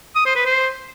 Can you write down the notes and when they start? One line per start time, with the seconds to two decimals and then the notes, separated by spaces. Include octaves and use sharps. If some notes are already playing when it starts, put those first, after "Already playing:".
0.15 D#6
0.25 C5
0.36 B4
0.46 C5